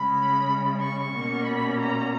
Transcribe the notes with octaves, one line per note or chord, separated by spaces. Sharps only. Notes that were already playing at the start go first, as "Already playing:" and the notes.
Already playing: C#3 G#3 C#4 B5
C#6
B2 A#3 C#4
B5
A#5